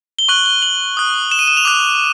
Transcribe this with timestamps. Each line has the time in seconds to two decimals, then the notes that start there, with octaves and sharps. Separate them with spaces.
0.19 G7
0.29 C#6 F#6 F#7
0.46 G7
0.62 F#7
0.97 D#6 F#6
1.31 E7
1.39 D#7
1.48 E7
1.57 F7
1.65 D6 F#6